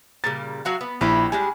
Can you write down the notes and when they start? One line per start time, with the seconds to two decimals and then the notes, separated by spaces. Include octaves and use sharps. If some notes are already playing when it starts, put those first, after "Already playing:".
0.24 A#2 C#3 G3 A6
0.65 F#3 F#4 F5
0.81 B3
1.01 A#1 E4 G4 B4
1.32 G3 G#3 D4 G#5